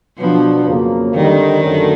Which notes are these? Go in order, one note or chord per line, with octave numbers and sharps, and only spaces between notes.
B2 F3 F#3 B3 D4 F#4
F2 C#3 F#3 A#3
D3 D#3 G3 C4 D#4
F#2 D3 F#3 A3 C#4